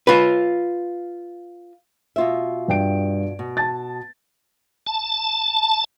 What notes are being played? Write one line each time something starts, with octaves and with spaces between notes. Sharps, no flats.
F4 B4
B2 F4 E5
G2 G5 D7
B2
A5 A6
A5